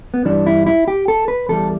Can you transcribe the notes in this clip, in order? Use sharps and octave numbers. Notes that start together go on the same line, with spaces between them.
B3
G2 E3 G3 D4
E4
E4
G4
A4
B4
E2 E3 G3 A4